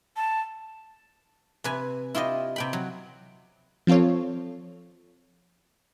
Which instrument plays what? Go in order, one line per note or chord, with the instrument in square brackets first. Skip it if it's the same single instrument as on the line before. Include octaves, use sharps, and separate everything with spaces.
[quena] A5
[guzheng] C3 B4 G#5
E4 F4 G4 D#5
C3 G5 B5
F#3
[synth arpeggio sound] F3 C4 F4 A4 C#5